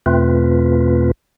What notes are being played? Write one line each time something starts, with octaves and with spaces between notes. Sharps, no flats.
E2 B2 A3 C4 F4 B4